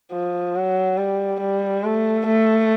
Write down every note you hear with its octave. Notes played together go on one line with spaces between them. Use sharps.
F3
F#3
G3
G3
A3
A3